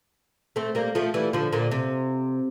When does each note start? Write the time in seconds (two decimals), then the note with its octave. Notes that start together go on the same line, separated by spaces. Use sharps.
0.56 A3 C4
0.75 G3 A#3
0.95 F3 A3
1.14 E3 G3
1.33 D3 F3
1.52 A#2 D3
1.71 C3